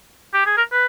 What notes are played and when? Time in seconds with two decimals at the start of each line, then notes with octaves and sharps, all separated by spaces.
0.34 G4
0.46 G#4
0.57 A#4
0.72 B4